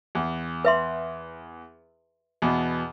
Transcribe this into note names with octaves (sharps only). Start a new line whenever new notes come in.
E2
B4 E5 C6
E2 B2